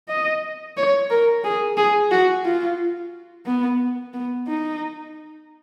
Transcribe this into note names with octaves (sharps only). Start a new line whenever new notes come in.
D#5
C#5
A#4
G#4
G#4
F#4
F4
B3
B3
D#4